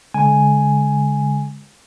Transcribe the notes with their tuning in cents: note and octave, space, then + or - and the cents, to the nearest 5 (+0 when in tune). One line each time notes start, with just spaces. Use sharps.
D3 -45 G#3 +0 G#5 +0